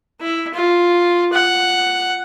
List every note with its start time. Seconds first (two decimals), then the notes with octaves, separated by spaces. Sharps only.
0.21 E4
0.54 F4
1.33 F#5